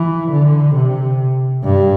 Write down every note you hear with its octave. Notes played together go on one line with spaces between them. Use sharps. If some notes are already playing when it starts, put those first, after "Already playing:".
Already playing: E3
D3
C3
G2